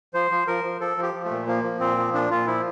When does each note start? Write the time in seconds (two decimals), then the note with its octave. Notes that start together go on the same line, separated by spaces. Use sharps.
0.14 F3 C5
0.31 F3
0.47 F3 A#4
0.64 F3
0.81 F3 A4
0.97 F3
1.03 G4
1.14 F3
1.25 A3
1.31 A#2
1.47 F3 A#3
1.64 F3
1.80 A#2 C4
1.98 F3
2.13 A#2 D4
2.30 A#2 F4
2.47 F3 E4